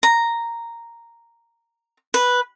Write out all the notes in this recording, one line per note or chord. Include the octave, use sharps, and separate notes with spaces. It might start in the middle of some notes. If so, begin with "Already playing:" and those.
A#5
B4